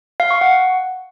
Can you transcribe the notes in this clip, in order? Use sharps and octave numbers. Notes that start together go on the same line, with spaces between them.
F5
C#6
F#5